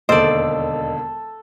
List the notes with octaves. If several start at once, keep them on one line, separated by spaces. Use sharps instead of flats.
E1 D#2 D3 A4 C5 D5 D#5